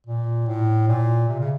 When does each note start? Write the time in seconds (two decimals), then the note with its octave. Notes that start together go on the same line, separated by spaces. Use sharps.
0.07 A#2
0.47 A2
0.88 A#2
1.29 C3
1.39 C#3